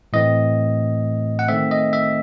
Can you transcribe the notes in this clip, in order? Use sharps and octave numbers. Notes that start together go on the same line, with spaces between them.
A2 E3 A3 C4 D#5
F#5
D#3 A3 C4 E5
D#5
E5